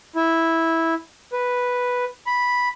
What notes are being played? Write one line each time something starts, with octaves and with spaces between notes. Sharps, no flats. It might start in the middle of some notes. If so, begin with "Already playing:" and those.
E4
B4
B5